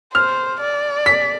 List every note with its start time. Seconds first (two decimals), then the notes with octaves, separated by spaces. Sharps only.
0.14 C5 F6
0.60 D5
1.06 B6